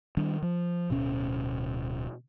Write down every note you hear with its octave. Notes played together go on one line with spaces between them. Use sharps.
D#3 G3 D4
F3
D1 B2 C#4